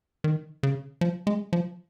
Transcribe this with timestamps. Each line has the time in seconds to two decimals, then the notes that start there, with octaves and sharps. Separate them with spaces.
0.24 D#3
0.63 C#3
1.01 F3
1.27 G#3
1.53 F3